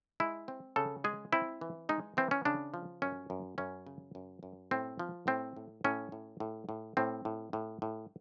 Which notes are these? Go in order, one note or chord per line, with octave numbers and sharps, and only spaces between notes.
G#3 E4
C4
C#3 A4
G#3 G#4
C4 E4
E3
G#3 D#4
E3 C4
C#4
C#3 D4
F3
F#2 C#4
F#2
F#2 C#4
C#3
F#2
F#2
A2 C4
F3
A2 C4
A2
A2 C#4
A2
A2
A2
A2 C4
A2
A2
A2